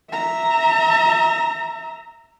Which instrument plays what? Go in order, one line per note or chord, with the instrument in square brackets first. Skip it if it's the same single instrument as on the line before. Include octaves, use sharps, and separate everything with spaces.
[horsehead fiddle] E5 A#5